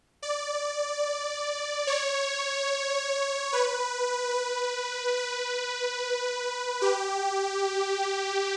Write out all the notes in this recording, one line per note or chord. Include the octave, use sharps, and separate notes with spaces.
D5
C#5
B4
B4
B4
G4